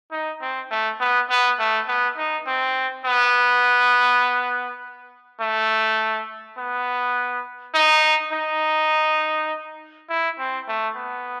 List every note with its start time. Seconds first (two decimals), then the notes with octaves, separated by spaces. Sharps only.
0.12 D#4
0.41 C4
0.71 A3
1.00 B3
1.30 B3
1.59 A3
1.88 B3
2.17 D#4
2.47 C4
3.05 B3
5.40 A3
6.58 B3
7.75 D#4
8.32 D#4
10.09 E4
10.39 C4
10.68 A3
10.96 B3